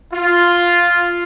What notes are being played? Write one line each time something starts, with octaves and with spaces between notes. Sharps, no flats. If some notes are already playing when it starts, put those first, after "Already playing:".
F4